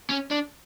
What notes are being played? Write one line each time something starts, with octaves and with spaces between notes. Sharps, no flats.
C#4
D4